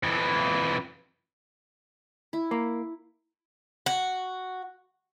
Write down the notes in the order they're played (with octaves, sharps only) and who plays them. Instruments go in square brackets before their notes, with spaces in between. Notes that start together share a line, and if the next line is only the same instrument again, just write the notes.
[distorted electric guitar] F2 E3
[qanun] E4
[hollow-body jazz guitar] A#3
[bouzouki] F#4